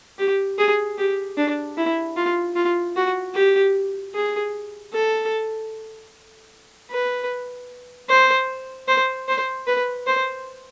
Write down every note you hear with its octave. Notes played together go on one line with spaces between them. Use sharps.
G4
G#4
G4
D4
E4
F4
F4
F#4
G4
G#4
A4
B4
C5
C5
C5
B4
C5